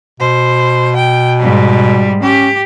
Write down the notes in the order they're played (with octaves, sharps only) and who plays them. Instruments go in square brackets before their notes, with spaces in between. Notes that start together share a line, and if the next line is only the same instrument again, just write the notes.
[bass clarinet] B2 [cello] C5
[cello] G5
G#2 G3
[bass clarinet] C#4 [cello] G4